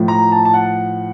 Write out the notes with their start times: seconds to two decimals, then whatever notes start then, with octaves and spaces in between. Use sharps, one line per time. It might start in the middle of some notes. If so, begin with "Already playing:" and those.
Already playing: A2 F3
0.08 A#5
0.32 A5
0.45 A5
0.54 F#5